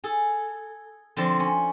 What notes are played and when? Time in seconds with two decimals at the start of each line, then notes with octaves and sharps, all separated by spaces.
0.04 G#4 A4
1.17 D3 F3 C4 A5 C6
1.40 C#4